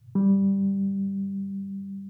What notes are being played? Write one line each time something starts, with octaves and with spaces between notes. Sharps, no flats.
G3